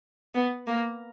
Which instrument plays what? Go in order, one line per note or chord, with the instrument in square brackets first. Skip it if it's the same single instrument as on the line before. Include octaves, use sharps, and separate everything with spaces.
[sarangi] B3
A#3